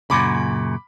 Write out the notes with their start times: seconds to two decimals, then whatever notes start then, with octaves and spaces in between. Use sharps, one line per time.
0.10 F#2 A#2 C#3 B5 D6